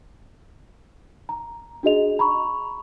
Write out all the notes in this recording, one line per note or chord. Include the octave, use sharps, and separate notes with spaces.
A#5
D4 F#4 G#4 D#5 F7
A#5 B5 C#6